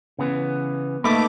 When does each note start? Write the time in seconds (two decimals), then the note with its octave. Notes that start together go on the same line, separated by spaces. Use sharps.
0.19 C#3 E3 B3
1.04 A3 A#3 D#4 A4 B4 D6